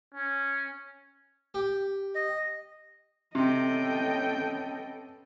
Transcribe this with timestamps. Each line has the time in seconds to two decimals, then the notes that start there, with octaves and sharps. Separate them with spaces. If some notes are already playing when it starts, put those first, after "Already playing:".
0.14 C#4
1.54 G4
2.15 D#5
3.35 C3 B3 C#4 A4 D#5 G5